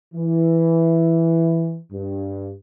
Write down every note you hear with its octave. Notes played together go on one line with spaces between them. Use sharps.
E3
G2